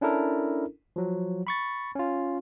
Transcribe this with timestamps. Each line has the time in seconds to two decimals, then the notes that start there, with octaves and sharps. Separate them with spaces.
0.01 C#4 D4 E4 A4 A#4
0.96 F3 F#3
1.47 B5 C#6 A6
1.95 C#4 F4